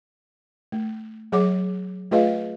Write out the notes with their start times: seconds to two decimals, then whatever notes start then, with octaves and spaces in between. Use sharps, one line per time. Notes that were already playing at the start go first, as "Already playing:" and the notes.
0.72 A3
1.32 F#3 G#4 C#5 F#5 D6
2.11 A3 F4 G#4 B4 D#5 F5